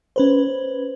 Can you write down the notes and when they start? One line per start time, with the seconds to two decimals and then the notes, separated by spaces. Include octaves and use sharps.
0.16 C#4 B4 C5